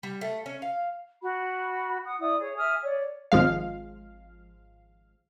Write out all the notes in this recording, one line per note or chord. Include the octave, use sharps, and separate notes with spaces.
G3
A3
C#4
F5
F#4 B5
F#5 D#6
E4 D5 D#6
G#4 C#5
E5 G#5 D#6 F6
C#5 D5
G#1 F3 G#3 F5